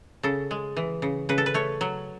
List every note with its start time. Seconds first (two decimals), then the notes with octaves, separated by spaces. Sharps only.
0.23 C#3 A4
0.51 G#3
0.77 E3
1.02 C#3
1.29 C#3 B4
1.38 A4
1.46 B4
1.54 A3 C#5
1.81 F#3